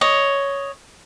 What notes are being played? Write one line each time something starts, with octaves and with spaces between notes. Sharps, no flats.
C#5 D#5